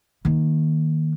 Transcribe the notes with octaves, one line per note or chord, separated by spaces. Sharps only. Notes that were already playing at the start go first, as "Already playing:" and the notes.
D#3 A#3